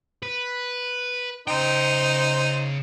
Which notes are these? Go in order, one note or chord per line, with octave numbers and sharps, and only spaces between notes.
B4
C#3 D#4 C5 G5